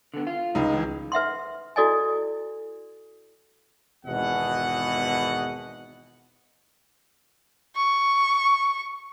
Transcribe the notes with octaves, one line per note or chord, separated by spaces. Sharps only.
D3 B3
F4
C#2 D#4
D#3 E3
B4 E5 F#5 C6
E4 F#4 A4 D5 D#5 G#5
G#1 E2 B2 D#5 F#5
C#6